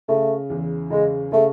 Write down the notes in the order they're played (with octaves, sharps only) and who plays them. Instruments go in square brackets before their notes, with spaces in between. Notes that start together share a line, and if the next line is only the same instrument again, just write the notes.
[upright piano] C#3 [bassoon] A3
[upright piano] E2
[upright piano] C#3 [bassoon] G#3
[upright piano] C#3 [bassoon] A3